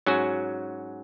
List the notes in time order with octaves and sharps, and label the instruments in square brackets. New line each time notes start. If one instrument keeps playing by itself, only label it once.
[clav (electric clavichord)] G#2 F#3 C#4 F#4